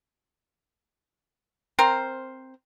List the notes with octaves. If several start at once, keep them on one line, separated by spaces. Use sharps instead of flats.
C4 A#4 C5